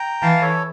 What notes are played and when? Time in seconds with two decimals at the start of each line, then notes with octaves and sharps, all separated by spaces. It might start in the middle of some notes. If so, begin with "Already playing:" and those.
Already playing: G5 A#5
0.22 E3 F5 A5
0.42 A4 C#5